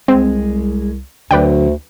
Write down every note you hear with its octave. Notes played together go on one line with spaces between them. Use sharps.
C2 G#3 C4
D2 D3 F#3 B4 D5 G5